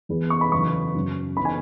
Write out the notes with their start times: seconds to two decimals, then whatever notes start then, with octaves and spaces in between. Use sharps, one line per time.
0.09 E2 E3 B3 G#4 B4
0.30 C#6
0.41 B5
0.52 E2 C#3 F#3 C#6
0.95 F#2 C#3 F#3 C#4
1.37 E3 B3 B5
1.45 G#5